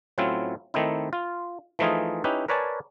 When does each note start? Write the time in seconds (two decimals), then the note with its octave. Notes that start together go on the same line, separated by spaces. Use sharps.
0.18 A2 F#3 C4 C#4 E4 F4
0.74 D#3 A3 C4 D#4 E4
1.13 F4
1.79 E3 F3 A3 D#4 F4 G#4
2.24 C#4 D#4 E4 G4 B4
2.48 A#4 B4 C#5 D5 G#5 A5